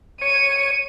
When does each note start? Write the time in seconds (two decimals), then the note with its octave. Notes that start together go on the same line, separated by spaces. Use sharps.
0.22 C#5 D#7